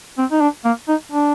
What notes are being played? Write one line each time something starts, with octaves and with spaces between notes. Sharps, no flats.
C4
D#4
D4
A#3
D#4
D4